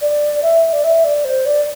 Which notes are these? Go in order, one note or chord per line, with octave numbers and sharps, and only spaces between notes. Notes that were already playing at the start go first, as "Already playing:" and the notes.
D5
E5
D5
E5
D5
C5
D5